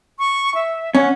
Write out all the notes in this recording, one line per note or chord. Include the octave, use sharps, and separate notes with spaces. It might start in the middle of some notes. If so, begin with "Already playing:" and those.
C#6
E5
C#4 F#5